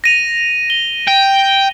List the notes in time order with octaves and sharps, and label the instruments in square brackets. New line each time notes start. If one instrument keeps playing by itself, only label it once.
[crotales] A#6 D#7 F7
G7
[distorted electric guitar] G5